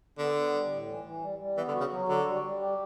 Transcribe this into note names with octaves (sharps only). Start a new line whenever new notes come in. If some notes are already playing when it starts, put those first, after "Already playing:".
D3 B3
B3
G3
A2
E3
E3
G3
G3
E3 B3
D3
F#4
C#3
F#3
D3 F#4
G3
G3
G4